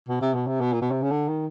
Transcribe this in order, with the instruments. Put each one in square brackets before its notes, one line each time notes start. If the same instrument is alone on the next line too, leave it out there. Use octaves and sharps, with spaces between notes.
[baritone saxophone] B2
C3
B2
C3
B2
A#2
B2
C3
C#3
D3
D#3